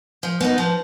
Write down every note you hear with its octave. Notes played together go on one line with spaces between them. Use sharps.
F3
B3 D#4
F3